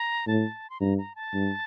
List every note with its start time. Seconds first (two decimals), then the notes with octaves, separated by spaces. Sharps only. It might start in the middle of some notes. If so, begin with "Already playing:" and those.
Already playing: A#5
0.27 A2 A5
0.70 C6
0.80 G2 A#5
0.98 A#5
1.15 A5
1.34 G2